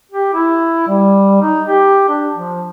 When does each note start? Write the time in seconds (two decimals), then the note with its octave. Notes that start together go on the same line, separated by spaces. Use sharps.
0.12 G4
0.34 E4
0.87 G3
1.42 D#4
1.67 G4
2.08 D4
2.34 F3